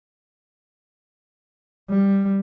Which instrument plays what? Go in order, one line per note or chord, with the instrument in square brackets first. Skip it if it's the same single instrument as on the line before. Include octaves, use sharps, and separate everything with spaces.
[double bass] G3